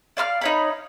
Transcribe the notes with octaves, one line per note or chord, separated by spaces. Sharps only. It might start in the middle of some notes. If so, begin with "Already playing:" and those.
D5 F5 B5 F6
D#4 C#5 B5